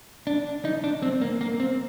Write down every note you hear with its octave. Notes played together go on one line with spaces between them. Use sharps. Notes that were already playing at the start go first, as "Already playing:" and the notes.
D4
D#4
D4
C4
A#3
A#3
C4